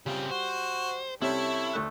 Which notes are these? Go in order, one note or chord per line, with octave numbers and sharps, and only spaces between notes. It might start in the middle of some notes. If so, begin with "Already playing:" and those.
C#3 G3 C4 F4
F#4 C5
C3 G3 C#4 E4 A4 C#5
D2 A3 F#6